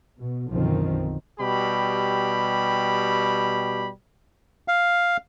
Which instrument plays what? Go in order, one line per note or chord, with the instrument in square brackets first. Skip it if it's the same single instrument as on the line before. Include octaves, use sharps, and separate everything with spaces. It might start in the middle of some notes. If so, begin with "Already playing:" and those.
[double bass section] B2
B1 F#2 D3 D#3 F3 C4
[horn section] B2 G3 G4 B5
[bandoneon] F5